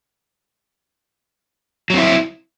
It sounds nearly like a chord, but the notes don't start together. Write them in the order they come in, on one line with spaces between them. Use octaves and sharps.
F#3 C4 E4